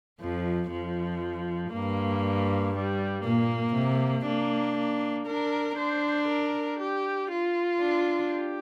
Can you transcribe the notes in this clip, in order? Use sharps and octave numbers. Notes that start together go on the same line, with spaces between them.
F2 F3
F2 F3
G2 A#3
G3
A#2 A#3
C3
A#3 D4
A#3
D4 A#4
D4 C5
A#4
G4
F4
D4
G4